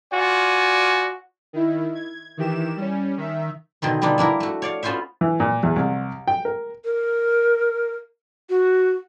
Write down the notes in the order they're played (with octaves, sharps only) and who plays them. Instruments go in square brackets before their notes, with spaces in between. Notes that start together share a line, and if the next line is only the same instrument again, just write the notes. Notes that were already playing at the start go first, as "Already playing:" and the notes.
[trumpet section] F4 F#4 D5 G#5
[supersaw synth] D#3 E4
G#6
D#3 E3 G4 E7
G3 C#4
D#3 E5
[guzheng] B2 D3 D#3 C4
D3 G3 B3 D4 D#4 F4
A#3 D4 E4 A#4
A3 F#4
C#5 D5 F5
B3 C#4 F4 F#4 C5 E5
[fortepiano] E3
A#2
E2
C2
G5
A#4
[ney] A#4
F#4